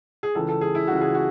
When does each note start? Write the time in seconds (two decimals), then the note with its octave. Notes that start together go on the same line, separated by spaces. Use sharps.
0.23 G#4
0.35 C#2 C#3 E3 A4
0.49 A4
0.61 G#4
0.75 E4
0.87 C#2 C#3 E3 F#4
1.01 G#4
1.15 F#4